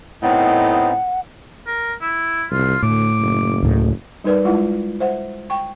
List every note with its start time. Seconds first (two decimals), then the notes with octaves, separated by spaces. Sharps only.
0.23 A2 B3 C4 D#4 D#5 F#5
1.67 A#4
2.01 E4
2.51 C2 F4
2.83 D2 A2 D6
3.19 F#1
3.63 D2 A2 D3
4.24 G3 D#4 A#4 B4 D5
4.45 G#3 E4 F4 F#5
5.00 C5 E5 F#5
5.50 G5 C#6